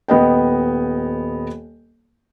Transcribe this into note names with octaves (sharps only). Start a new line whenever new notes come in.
D#1 B3 D#5 G5